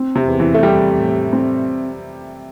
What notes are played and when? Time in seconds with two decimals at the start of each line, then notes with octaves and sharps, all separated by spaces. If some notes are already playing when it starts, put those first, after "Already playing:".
Already playing: C4
0.15 C3
0.27 E2
0.40 E3
0.54 A3
0.63 G3 C4
0.98 A2
1.33 C4